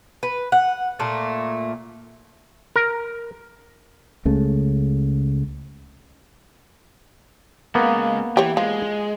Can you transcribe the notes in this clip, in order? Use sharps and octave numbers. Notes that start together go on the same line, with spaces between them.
B4
F#5
A#2 A3 A#3
A#4
C#2 C#3 A3
C#2 C#3 A#3 B3 A#4
E3 G4 C#5
F3 G#3